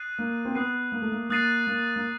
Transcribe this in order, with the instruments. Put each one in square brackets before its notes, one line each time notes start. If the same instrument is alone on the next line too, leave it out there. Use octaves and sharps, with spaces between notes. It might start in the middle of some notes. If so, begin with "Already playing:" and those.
Already playing: [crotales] D#6 F#6 A6 C7 D#7
[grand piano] A#3
C4
[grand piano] B3 [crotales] D#6 F#6 A6 C7 D#7
[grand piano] A#3
A3
A#3
[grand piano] A#3 [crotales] D#6 F#6 A6 C7 D#7
[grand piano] A#3
A#3